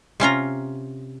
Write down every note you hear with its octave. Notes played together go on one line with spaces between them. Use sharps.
C3 C#4 F4 A#5